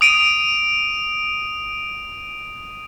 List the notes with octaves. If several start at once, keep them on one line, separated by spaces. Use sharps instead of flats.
D#6 D7 D#7